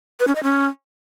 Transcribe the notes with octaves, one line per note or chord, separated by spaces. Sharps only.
B4
C#4
D#5
C#4